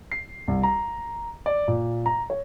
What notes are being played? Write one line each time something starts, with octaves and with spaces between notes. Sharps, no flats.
C7
C2
A#5
D5
A#2
A#5
C#5